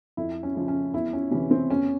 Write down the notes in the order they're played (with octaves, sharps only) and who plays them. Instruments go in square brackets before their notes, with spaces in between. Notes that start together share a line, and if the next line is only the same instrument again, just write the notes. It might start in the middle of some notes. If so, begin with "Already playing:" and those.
[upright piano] F2 E4
C#4
C#3 F3
C#4
E2 E4
C#4
C3 E3 C#4
C4
E2 C#4